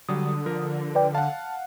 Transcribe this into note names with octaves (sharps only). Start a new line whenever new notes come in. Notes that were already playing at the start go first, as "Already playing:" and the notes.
D3 F#3 G3 D#6
F3 A#4
B4 D5 G5
F5 F#5 A5